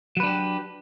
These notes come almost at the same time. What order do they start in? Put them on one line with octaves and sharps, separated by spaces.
F#3 B4 D4 G4